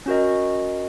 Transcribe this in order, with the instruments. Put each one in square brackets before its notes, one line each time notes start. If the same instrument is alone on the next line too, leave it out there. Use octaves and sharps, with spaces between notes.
[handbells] C#4 F#4 A#4 D#5